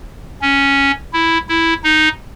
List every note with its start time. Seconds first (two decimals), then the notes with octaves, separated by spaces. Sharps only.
0.41 C#4
1.13 E4
1.49 E4
1.84 D#4